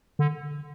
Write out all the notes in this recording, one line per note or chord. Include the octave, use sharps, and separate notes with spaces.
D3